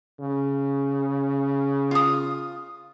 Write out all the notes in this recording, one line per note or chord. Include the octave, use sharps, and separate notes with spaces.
C#3
F4 D#6